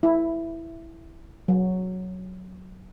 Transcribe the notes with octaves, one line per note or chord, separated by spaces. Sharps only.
E4
F#3